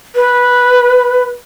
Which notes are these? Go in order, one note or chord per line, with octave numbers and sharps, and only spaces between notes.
B4